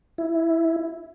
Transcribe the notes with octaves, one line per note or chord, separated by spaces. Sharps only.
E4